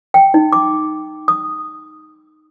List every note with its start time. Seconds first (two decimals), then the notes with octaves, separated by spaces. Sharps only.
0.14 G5
0.34 D#4
0.53 D6
1.28 D#6